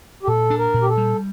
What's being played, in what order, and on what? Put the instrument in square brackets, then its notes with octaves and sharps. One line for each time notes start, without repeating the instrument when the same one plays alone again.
[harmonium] G4
[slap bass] A#2 [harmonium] A4
[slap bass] D4
[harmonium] A#4
[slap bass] A#2
[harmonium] G4
A4
[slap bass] G3